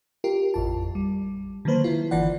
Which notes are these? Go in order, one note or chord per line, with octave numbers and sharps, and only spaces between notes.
F4 G4 A#4
A1 F2 A5
G3
D3 D#3 F#3 A#3 B4 C5
D#3 E4 F4
G1 D3 E3 D5 F#5